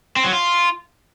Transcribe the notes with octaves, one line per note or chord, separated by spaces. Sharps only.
C4
F#3
F4